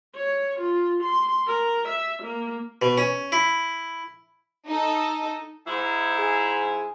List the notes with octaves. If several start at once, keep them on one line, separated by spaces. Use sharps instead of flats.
C#5
F4
C6
A#4
E5
A#3
B2
C#4
E4
D#4 A4
G#2 E4
G#4